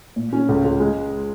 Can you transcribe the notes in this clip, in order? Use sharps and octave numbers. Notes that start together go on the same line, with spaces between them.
A#2
C#4
C#2
C#2
G#3